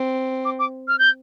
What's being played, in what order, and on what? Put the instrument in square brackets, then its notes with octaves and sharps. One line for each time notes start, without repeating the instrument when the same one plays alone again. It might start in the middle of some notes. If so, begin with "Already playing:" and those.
Already playing: [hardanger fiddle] C4
[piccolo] D6
D6
F6
G6